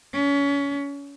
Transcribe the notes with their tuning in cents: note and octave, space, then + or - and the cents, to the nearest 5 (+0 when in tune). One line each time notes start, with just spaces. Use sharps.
C#4 +30